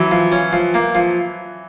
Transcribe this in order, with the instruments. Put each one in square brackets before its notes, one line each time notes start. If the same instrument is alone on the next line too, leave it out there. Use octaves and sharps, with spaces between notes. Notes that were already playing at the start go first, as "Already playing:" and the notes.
Already playing: [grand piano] E3 F#3
[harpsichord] F3
C#4
F3
A#3
F3